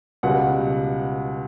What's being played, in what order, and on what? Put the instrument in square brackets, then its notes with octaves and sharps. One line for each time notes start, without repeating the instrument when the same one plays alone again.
[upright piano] C#2 B2 G3 F#5